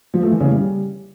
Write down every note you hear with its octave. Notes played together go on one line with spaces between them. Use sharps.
F3
A3
E3
C#3
G3